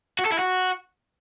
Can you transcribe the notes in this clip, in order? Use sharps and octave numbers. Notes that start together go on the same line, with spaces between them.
F#4
A4
E4
F#4